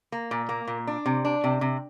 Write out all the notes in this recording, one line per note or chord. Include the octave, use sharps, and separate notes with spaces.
A#3
A#2
A#3
A#2
D4
C3
D4
C3
C3